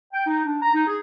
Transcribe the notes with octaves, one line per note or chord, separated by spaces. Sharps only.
G5
D#4
D4
A#5
D#4
G#4